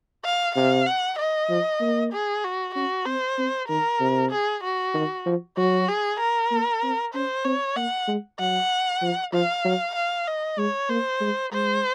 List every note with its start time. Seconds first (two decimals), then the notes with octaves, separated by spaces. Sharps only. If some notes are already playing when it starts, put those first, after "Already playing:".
0.25 F5
0.56 C3 F5
0.86 F#5
1.19 D#5
1.49 F3
1.80 A#3
2.13 G#4
2.44 F#4
2.75 C#4 F#4
3.06 C4 C5
3.38 C4
3.69 D#3 A#4
4.00 C3
4.31 G#4
4.64 F#4
4.94 D#3
5.26 F3
5.57 F#3 F#4
5.88 G#4
6.20 A#4
6.51 A#3
6.83 C4
7.14 C#4 C5
7.44 C4 C#5
7.76 A#3 F#5
8.08 G#3
8.40 F#3 F#5
9.02 F3
9.33 F3 F5
9.64 F#3
9.95 F5
10.27 D#5
10.58 G#3 C#5
10.89 A#3 C5
11.21 G#3
11.52 G#3 C5